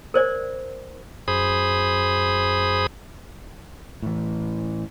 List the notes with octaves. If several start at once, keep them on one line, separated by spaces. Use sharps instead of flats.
A#4 C5 D5
F#2 G#4 C5 B5 D#6
A2 E3